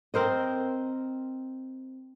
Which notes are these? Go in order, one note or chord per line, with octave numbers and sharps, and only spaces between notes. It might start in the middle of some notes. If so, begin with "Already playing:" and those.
C4 A#4 C5 D#5